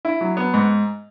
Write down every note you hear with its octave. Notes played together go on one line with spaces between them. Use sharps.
E4
F#3
B3
G#2